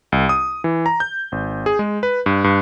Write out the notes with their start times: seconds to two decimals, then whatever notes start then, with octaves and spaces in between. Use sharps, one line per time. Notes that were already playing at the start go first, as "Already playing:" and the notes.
0.12 C2
0.29 D#6
0.64 E3
0.86 A#5
1.00 G6
1.32 G#1
1.66 G#4
1.79 G#3
2.03 B4
2.26 G2
2.44 G2